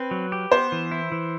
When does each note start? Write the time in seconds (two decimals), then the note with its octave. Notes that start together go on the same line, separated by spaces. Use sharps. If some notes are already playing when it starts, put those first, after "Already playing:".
Already playing: C4 B4
0.11 F#3
0.32 G4
0.52 B3 C5
0.72 E3
0.91 E4
1.12 E3